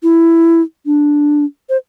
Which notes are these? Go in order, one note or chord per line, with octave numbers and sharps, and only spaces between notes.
E4
D4
C5